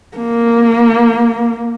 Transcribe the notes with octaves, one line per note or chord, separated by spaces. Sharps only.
A#3